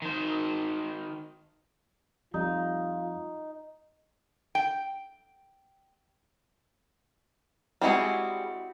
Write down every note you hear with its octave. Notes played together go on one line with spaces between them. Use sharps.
D#3 C5
F2 G3 D#4 F4
G5
G3 G#3 C4 E4 F#4 G#4